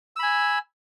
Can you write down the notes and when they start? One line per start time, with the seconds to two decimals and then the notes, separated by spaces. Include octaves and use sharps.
0.16 E6
0.19 B5
0.23 G#5